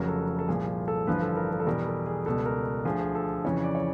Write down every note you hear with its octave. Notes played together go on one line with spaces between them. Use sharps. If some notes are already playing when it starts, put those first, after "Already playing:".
Already playing: F1 F2 C#3 F#3 A#4
A4
A4
C2 A#2 F3 G#4
G#4
A4
A1 G2 D3 F3 B4
A4
A#4
A#4
A4
E2 B2 G3 A#4
A4
G#4
C#2 B2 G3 A4
A#4
D2 D3 F3 G#4
G#4
A4
F2 C#3 E3 C#5
D5
C#5